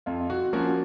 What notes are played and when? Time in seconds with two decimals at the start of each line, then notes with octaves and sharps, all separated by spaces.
0.06 F2 F4
0.30 F#4
0.53 F3 A#3 C#4 F#4